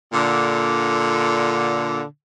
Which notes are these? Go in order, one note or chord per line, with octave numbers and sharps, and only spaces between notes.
A#2 D3